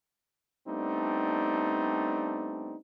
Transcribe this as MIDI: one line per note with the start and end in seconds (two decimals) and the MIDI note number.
0.67 2.75 55
0.67 2.75 57
0.67 2.75 59
0.67 2.75 60
0.67 2.75 62
0.67 2.75 63